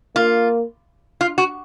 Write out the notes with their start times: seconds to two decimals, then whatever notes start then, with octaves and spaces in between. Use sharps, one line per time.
0.16 A#3 F4
1.21 F4
1.38 F#4